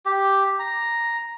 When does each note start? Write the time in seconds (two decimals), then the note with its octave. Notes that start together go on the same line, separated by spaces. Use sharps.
0.06 G4
0.59 A#5